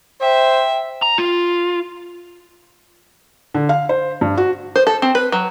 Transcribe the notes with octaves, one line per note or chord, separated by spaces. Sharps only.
C5 E5 G5
A#5
F4
D3
F5
C5
G2
F#4
C5
A4
C4
B4
F#3